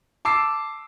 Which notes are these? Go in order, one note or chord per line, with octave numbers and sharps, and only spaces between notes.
A5 D6 E6 C7